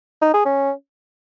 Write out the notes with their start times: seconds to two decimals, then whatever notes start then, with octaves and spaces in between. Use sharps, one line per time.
0.22 D#4
0.34 G#4
0.45 C#4